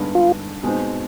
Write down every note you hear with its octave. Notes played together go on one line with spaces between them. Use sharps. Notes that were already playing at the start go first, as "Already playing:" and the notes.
Already playing: G2 D3 G#3 B3 D#4
F4
B2 G#3 C4 D#4